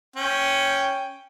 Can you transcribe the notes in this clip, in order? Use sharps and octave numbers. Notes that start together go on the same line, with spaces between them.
C#4 G5